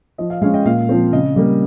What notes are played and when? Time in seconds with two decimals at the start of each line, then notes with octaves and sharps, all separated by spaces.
0.18 F3 D#5
0.30 F5
0.42 G#3 C#4 F5
0.54 D#5 G5
0.65 A#2 F5
0.89 F3 C4
1.12 C#3 D#5
1.36 G3 A#3